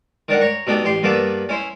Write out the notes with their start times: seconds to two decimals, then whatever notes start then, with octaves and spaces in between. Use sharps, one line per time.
0.28 D#3 D4 A#4 F#5
0.41 C#5 A#5 C#6
0.67 B2 D4 D#4 G4 A4
0.84 A1 G4 C6
1.03 G2 A#3 B3 A4 D5 E5
1.49 C#4 E4 C5